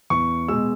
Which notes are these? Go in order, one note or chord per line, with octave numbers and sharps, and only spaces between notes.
E2 C#6
B2 G#3 E6